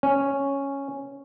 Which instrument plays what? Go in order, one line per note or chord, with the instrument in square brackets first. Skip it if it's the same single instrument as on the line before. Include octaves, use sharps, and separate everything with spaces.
[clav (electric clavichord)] C#4